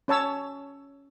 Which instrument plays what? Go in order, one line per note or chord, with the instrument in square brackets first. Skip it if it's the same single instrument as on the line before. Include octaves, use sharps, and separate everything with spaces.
[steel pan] C#4 C#5 A5 E6